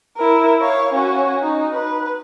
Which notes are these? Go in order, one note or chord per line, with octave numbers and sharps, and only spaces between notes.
E4 A#4
C#5 F5
C#4 F#4
D#4
B4